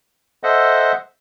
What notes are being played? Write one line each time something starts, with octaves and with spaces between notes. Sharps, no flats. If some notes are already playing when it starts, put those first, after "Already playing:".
A4 C5 D#5 E5 F#5